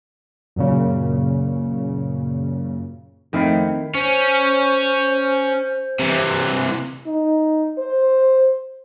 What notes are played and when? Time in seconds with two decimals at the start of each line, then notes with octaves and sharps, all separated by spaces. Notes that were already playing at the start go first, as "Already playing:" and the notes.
0.56 F#2 A#2 C#3
3.33 F2 D#3 A3 C4 E4
3.95 C#4 C5
5.99 C3 E3
7.07 D#4
7.78 C5